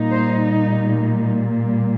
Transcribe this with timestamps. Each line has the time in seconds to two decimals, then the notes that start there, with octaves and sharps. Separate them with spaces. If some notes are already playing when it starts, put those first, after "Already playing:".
Already playing: A#2 G3 D#4
0.12 C5